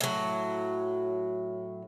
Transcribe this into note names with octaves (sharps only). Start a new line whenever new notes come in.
A2 F#3